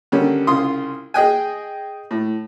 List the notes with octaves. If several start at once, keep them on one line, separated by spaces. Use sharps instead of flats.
D3 D#3 G3 C#4
C2 C#3 F4 C6 D#6
G#4 D#5 G5 G#5
A2